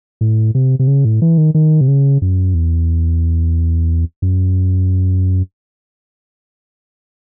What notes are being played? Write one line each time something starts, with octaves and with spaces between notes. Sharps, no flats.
A2
C3
C3
C#3
A2
E3
D#3
D#3
C3
C#3
F#2
E2
F#2